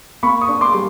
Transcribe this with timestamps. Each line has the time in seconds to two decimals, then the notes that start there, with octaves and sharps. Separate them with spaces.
0.23 A#3 B5 C#6
0.41 C#6 D#6
0.48 D4
0.61 C6 D6
0.74 G3